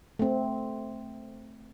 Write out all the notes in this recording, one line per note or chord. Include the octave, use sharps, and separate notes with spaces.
A3 C4